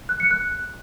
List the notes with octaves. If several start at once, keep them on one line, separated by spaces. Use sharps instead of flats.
F#6
C#7
F#6